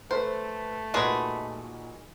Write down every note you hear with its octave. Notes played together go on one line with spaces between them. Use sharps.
A3 A4 B4 C5
A#2 D#3 G#3 F#4 G#4 A#4 B4 D5